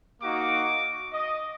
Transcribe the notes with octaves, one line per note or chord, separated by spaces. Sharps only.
A#3 D#4 F#4 D6
D#5